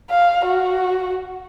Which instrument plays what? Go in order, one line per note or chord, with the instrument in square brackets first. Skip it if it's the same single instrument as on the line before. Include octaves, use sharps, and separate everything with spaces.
[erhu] F5
F#4